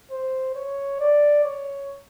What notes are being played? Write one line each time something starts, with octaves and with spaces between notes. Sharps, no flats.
C5
C#5
D5
C#5